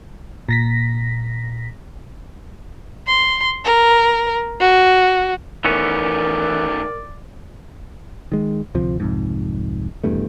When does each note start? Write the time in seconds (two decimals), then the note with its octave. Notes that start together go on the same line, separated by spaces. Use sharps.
0.49 A#2 A#6 B6
3.08 C6
3.65 A#4
4.60 F#4
5.65 D#3 E3 A3 B3 C#4 A#4 D5
8.32 D#3 G#3
8.75 D2 C3 F3
9.00 C2 F2 G#2
10.04 D#1 E2 G2 A3